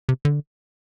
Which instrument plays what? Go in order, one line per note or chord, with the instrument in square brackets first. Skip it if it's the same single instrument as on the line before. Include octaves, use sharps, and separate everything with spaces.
[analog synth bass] C3
D3